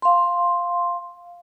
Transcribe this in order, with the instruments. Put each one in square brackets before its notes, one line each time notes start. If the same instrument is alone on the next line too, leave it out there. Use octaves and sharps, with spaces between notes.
[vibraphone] F5 C6